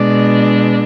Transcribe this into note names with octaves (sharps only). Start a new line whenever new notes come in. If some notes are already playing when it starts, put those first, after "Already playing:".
Already playing: B2 G#3 D4 D5